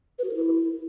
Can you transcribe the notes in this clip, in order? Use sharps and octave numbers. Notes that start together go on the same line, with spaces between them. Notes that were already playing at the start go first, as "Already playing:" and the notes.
B4
F#4
A#4
E4